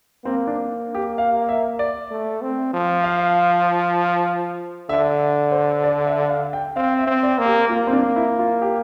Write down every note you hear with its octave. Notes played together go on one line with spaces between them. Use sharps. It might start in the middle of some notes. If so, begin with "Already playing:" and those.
A#3 C4
D4
G4
F5
E5
D5
A3
C4
F3
F5
D3 E5
C5
D5
E5
F5
G5
C4 F5
E5
C4
D5
A#3
G4
A#3 F4
C4
D4
E4
F4
G4